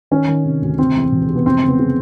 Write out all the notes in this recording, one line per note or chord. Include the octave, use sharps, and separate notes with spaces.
D#3 C#4
D#3
C3
D2
C3 C4
E2
E1
C3
B3
F1 C4
C#3
B3
C#3